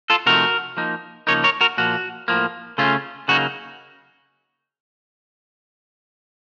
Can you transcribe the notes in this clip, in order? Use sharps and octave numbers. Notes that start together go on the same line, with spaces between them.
F4 A4
C3 F3 A3 D#4 F#4 A#4
F3 A#3 D#4
C#3 F3 A#3 D#4 A#4 C#5
A#4 C#5
F#4 A#4
A#2 F3 A#3 F#4
A2 F3 A#3
C#3 A3 C#4 F4
C#3 F#3 A#3 D#4 F#4